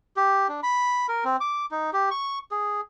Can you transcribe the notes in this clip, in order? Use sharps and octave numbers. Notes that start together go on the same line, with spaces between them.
G4
D4
B5
A#4
C4
D6
D#4
G4
C#6
G#4